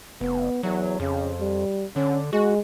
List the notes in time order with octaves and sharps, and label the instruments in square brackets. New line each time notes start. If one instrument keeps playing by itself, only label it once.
[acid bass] F1 [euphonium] B3
[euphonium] E2 [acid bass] F#3
[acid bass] F2 [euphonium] C#3
[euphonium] G3
[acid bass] D3 [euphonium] C#4
[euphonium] G#3 [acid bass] F#4